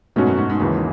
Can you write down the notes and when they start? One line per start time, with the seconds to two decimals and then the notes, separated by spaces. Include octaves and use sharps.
0.16 G#2 B2 A3 C#4 F#4
0.27 F#2
0.37 G#2
0.50 G#2
0.60 D#2 G#2 C#3 E3